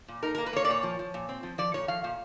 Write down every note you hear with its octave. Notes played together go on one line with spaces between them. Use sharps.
A#2
D#4 A#4
A#4
A#3
B4
A#3 C#5
D5
A#2 C#5
F3
F3
A#2
C4
F3
F3 D5
A#2 C#5
F3 F5
A#2